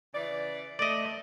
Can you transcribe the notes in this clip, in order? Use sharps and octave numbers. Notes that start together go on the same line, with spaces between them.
C#3 E3 D5
A3 D5 D#5